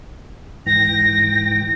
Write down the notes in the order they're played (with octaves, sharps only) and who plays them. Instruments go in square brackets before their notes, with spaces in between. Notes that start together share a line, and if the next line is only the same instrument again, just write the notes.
[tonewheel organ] G#2 E3 G5 [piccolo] A#6